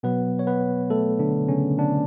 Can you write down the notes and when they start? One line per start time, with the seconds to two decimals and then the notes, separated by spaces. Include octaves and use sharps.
0.03 B2 F#3 B3 B4
0.39 C#5
0.47 B3 B4
0.90 A3 A4
1.19 D3 D4
1.48 C#3 C#4
1.78 D3 D4